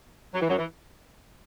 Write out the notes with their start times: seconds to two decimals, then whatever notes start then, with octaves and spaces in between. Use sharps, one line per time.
0.34 F#3
0.42 E3
0.49 F#2 F#3
0.58 E3